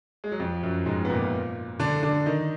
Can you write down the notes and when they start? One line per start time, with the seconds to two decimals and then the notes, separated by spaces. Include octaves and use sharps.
0.24 G#3
0.31 F#3
0.39 F2 F3
0.63 F#2 F#3
0.86 G#2 G#3
1.05 B3
1.10 A#2 A#3
1.79 D3 D4
2.03 D3 D4
2.26 D#3 D#4